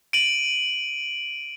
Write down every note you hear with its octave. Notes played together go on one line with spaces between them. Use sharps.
D7 D#7 F#7